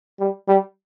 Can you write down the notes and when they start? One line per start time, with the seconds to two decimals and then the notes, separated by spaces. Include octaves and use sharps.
0.20 G3
0.48 G3